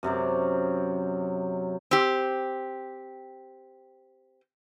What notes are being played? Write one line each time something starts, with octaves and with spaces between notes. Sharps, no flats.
F#2 C3 F#3 D5
C4 G4